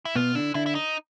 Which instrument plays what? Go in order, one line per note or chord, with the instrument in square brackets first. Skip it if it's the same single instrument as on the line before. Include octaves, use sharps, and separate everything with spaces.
[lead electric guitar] E4
[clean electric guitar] B2 B3 [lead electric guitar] F4
[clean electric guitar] D3 D4 [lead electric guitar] E4
[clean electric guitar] D3 D4 [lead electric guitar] E4
[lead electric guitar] E4
D#4